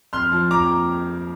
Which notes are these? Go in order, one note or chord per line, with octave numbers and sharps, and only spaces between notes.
F2 C6 F6
F3
F2 A#5 D6